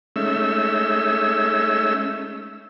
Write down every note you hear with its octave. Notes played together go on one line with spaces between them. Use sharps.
G#3 A3 C#4 D#4 E5 E6